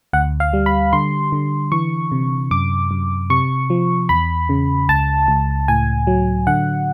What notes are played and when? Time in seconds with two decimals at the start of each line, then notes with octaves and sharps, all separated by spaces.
0.13 D2 F#5
0.40 F5
0.53 G3
0.66 B5
0.93 D3 C6
1.32 D3
1.72 E3 C#6
2.12 C3
2.51 F#2 D6
2.91 F#2
3.30 C3 C#6
3.70 F3
4.09 E2 B5
4.49 C#3
4.89 C#2 A5
5.28 C#2
5.68 A2 G#5
6.07 F#3
6.47 D3 F#5